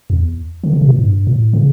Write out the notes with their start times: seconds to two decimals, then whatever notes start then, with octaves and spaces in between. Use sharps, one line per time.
0.10 E2
0.64 D3
0.73 C#3
0.81 B2
0.90 A2
0.99 G2
1.27 A2
1.53 C#3